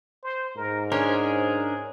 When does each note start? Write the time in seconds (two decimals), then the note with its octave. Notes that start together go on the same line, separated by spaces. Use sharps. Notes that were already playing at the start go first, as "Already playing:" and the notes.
0.23 C5
0.57 G#2 A#4
0.92 C#4 D4 G#4 A#4 C5